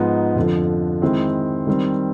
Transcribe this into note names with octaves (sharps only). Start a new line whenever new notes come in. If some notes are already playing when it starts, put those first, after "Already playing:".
Already playing: G#2 F3 G#3 B3 D#4
F2 D3 F3
D#3 G#3 C4 E4
D#3 G3 C4